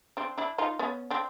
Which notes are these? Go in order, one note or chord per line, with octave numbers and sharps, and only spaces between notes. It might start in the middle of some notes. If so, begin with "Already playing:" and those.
C4 D4
D4 E4
D#4 F4
B3 C#4
C4 D4